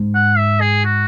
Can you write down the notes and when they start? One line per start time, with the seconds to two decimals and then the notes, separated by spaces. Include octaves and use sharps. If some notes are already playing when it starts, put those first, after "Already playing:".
Already playing: G#2
0.15 F#5
0.38 E5
0.61 G#4
0.85 F#4